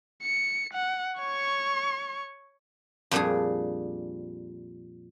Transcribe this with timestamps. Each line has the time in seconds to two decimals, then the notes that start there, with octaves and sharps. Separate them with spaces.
0.22 C#7
0.74 F#5
1.20 C#5 C#6
3.11 F2 A#2 G3 D4 G#4